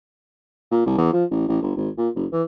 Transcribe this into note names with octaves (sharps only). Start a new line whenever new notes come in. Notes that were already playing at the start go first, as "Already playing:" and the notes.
A#2
C2
E2
F3
A1
A1
G1
G#1
A#2
F#1
E3